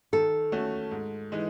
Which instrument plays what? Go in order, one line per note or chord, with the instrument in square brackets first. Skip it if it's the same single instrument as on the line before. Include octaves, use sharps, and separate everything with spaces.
[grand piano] D#3 [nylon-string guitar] A4
[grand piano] A3 C#4 F#4
G#2
E3 G#3 D#4